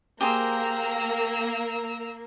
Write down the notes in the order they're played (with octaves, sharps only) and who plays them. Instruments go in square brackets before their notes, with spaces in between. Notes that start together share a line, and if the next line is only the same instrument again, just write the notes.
[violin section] A#3 [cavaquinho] G4 G#4 C5 [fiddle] A#5 E6